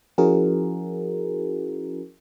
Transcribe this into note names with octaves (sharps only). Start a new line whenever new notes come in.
F3 C#4 E4 F#4 G#4 A#4